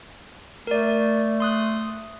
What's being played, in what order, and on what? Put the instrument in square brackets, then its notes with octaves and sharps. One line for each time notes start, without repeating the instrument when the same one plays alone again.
[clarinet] A3 [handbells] A#4 D5
[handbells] C6 D#6 F#6